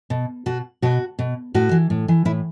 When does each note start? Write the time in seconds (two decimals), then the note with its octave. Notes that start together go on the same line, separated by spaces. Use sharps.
0.10 B2
0.46 B2 F#4
0.82 B2 F#4
1.19 B2
1.54 A2 F#4
1.71 E3
1.90 A2
2.08 E3
2.25 A2 E4